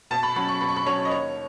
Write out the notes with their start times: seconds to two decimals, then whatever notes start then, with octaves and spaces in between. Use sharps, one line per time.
0.11 B2 A5
0.23 B5
0.36 F#3 C#4 B5
0.49 C#6
0.61 B2 B5
0.69 C#6
0.76 B5
0.86 F#3 C#4 C#5
1.05 D#5
1.11 D#2 C#5